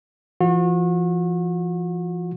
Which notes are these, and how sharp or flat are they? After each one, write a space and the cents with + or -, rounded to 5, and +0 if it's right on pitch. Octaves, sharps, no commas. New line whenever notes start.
F3 -40 F#4 -40